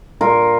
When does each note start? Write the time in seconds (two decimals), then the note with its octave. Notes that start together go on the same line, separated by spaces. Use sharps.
0.21 A#2 F4 A#4